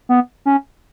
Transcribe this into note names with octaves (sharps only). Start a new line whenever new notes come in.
B3
C#4